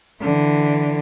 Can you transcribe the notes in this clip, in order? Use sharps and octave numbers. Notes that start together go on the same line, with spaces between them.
D3 E3